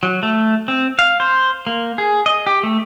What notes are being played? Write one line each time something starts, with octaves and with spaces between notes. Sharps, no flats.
F#3
A3
C4
F5
C5
A#3
G#4
D#5
G4
A3